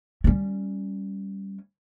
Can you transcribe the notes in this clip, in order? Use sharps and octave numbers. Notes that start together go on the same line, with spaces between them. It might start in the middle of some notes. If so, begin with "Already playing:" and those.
G3 C#4